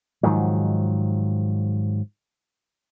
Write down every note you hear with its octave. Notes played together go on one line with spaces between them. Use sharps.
G#2 D#3 F3 F#3